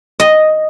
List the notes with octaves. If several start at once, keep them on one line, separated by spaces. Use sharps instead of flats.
D#5